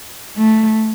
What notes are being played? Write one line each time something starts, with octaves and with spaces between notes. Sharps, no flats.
A3